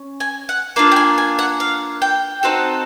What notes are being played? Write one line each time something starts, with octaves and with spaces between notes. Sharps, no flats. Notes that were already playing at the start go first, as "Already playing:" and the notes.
Already playing: C#4
G#5
F#5
A#3 D4 F4 F5
G5
G#5
G#5
F#5
F5
G5
C4 D#4 F#4 A4